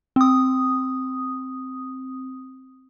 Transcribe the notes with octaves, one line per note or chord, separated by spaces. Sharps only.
C4 D#6